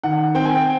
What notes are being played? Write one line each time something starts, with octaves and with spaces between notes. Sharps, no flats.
D#3 F#5
C4 G5
G#5
G5